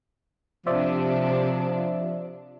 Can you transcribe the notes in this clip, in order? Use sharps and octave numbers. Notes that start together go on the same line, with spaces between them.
C3 F3 D4 C5 D5 E5